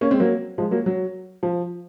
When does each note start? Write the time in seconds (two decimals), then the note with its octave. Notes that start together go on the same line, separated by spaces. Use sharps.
0.01 A#3 C#4
0.10 G#3 C4
0.20 F#3 A#3
0.58 F3 G#3
0.71 F#3 A#3
0.86 F#3
1.43 F3